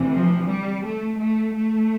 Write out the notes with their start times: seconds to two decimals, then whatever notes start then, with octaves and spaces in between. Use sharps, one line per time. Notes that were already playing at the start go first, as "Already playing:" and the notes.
Already playing: D2 C3 E3
0.15 F3
0.49 G3
0.84 A3
1.19 A3
1.54 A3